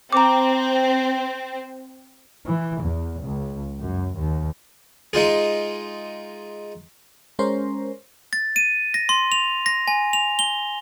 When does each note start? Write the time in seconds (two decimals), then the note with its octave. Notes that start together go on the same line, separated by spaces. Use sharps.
0.13 C4 A#5 D6
2.47 E3
2.82 E2
3.22 C#2
3.82 F#2
4.18 D#2
5.13 G#3 D#4 F4 G#4
7.39 G#3 C#4 A#4 C5
8.33 A6
8.56 D#7
8.94 A#6
9.09 C6
9.32 F7
9.66 A#6
9.88 G#5
10.13 F7
10.39 G7